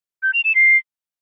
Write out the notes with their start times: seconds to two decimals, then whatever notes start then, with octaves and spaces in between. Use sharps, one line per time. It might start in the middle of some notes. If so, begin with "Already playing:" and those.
0.23 G6
0.34 F7
0.45 E7
0.55 C7